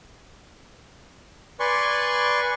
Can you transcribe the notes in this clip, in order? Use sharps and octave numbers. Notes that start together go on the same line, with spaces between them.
B4 D5 G#5 C6 C#6